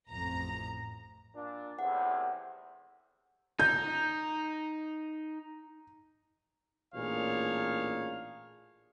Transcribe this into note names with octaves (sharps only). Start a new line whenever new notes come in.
A1 F2 A#5
A#2 D4
E2 A2 C3 F#5
D#4 G6
A1 A#2 D4 G#4 C#5 F5